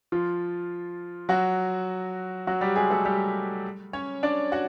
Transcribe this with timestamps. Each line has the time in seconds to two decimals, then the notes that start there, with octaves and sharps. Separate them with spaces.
0.12 F3 F4
1.29 F#3 F#4
2.47 F#3 F#4
2.61 G3 G4
2.76 G#3 G#4
2.90 A3 A4
3.05 G3 G4
3.93 C#4 C#5
4.23 D4 D5
4.52 F#4 F#5